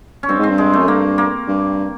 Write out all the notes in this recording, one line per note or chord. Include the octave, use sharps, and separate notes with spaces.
C#4
G2 C4
G#2 C4
G2
G#3
A3
F#2
G2 A#3
A#3
G2